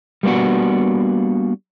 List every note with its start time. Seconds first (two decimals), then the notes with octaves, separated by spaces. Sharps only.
0.23 G3 A#3 B3 D4 F#4